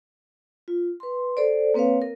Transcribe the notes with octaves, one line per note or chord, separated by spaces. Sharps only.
F4
B4 C6
A4 C5 D5
A#3 C4 B4 C#5 F5
A#4